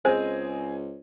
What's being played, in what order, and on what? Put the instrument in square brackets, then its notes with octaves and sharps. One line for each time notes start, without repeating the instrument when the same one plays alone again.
[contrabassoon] C#2 [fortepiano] C4 D#5 [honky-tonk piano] G#4 [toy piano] C5